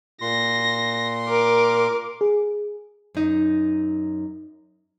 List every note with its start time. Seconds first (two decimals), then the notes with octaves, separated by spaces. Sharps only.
0.21 A#2 C6 A#6
1.29 A#4 D6
2.21 G#4
3.15 F#2 D#4